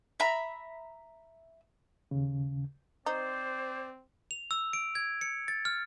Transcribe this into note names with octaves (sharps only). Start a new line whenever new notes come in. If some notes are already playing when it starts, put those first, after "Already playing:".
E5 A#5 B5
D#2 C#3
C4 D#4 C5 D5
F7
E6
D7
G#6
C#7
A6
F6